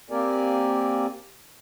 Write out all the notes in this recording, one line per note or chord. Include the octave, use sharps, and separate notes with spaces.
A#3 C4 G4 A#4 D5 G#5